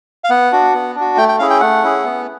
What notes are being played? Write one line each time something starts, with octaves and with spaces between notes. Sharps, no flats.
F5
B3 F#5
D4 F#4
B3
D4
F#4
A3 G5
G5
C#4 E4 G#4 F5
G5
A3 F#5
C#4 E4 G#4
B3